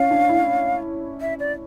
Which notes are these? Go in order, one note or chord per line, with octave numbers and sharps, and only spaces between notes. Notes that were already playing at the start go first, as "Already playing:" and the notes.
Already playing: C#4 F5
D4
E4
E5
D5